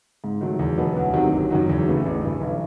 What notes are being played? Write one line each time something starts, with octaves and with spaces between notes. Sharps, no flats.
G#2
D#3 F#3 A3
E2
B2 F#3 B3
D2
C3 D#3 F#3
G1
F#2 D#3 F#3
E2
C#3 E3 A3
A1
G2 E3
B1